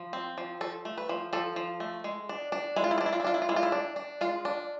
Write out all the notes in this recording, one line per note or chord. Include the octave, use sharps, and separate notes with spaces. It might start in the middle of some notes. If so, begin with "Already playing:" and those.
Already playing: F3
C4
F3
F3 A4
A3
B4
F3
F3 A4
F3
A3
G#3
D4
D4
G#3 E4
F4
E4
F4
D4
E4
F4
E4
D4 F4
E4
F4
G#3 E4
F4
E4
D4
D4
G#3 F4
D4